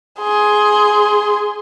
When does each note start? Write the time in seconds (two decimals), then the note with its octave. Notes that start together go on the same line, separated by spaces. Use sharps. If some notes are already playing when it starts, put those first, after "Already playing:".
0.20 G#4 C6